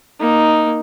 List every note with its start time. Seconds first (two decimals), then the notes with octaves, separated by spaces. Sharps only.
0.20 A#3 D#4